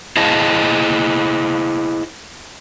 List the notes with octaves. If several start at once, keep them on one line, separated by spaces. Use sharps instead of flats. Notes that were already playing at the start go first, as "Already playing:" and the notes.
E4 G#4 C5 D#5 F5 A5